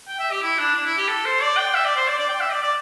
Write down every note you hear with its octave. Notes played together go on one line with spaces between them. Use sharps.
G5
E5
G4
E4
D4
D4
E4
G4
A4
C5
D5
G5
E5
D5
C5
D5
D5
G5
E5
D5
D5